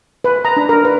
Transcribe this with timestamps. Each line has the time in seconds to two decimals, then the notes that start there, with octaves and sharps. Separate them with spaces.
0.24 B4
0.45 A#5
0.57 D4
0.69 A#4
0.85 B4